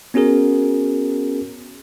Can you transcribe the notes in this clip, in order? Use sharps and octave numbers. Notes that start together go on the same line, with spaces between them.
B3 C#4 F#4 G#4 A#4